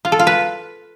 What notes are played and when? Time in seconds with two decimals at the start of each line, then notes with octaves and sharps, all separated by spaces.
0.05 F4
0.12 A4
0.19 F4
0.27 B4